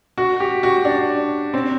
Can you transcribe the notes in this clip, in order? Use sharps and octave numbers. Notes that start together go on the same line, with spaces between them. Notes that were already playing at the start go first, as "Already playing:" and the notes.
F#4
G4
F#4
D4
C4